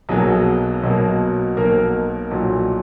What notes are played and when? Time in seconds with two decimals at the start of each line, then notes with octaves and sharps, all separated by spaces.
0.09 B1 B2 F#3 A#3 G#4
0.83 B1 B2 F#3 A#3
1.57 B1 B2 F#3 A#3 A#4
2.31 B1 A#2 F#3